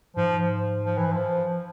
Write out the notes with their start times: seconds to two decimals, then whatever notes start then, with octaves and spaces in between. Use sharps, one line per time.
0.16 G#2 F3
0.85 F3
0.98 E3
1.12 F3